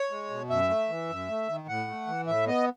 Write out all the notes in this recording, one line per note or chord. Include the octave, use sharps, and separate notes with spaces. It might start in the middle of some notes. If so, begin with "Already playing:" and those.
Already playing: C#5
G#3
B2
F#2 E5
A3
E3
F#2
A3
D#3
A2 F#5
A3
E3
A2 E5
B3 D#5